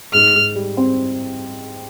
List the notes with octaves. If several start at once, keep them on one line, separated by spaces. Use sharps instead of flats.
G#2 F6
G#2
G3
C4